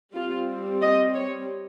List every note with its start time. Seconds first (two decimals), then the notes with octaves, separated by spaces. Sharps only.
0.15 G3 C4 F4
0.82 D#5
1.14 C#5